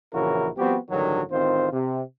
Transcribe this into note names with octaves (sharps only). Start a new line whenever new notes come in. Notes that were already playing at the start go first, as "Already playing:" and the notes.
A#1 C#3 E3 E4 F#4 A#4
F3 G3 B3 C4 F#4 G4
A1 G2 D3 D#3 F#3
A1 D#3 C4 F4 C5
C3